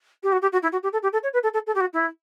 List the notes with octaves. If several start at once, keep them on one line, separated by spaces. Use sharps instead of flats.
G4
F#4
G4
F#4
E4
F#4
G4
A4
G4
A4
C#5
B4
A4
A4
A4
G4
F#4
E4